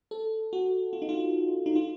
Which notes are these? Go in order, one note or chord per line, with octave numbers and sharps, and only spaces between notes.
A4
F#4
F4
D#4
F4
D#4
F4